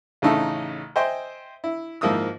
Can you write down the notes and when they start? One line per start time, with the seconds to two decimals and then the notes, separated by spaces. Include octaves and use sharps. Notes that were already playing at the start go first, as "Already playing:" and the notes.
0.22 A1 C#3 A3 D#4 E4 A4
0.96 C5 D#5 E5 G5 G#5 C6
1.64 E4
2.01 G#2 F3 A#3 E4 D#6 E6